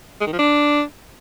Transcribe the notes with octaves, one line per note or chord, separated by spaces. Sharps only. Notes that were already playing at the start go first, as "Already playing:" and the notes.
G#3
D#3
F3
D4